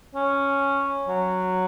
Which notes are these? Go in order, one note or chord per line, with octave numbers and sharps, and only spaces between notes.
C#4
F#3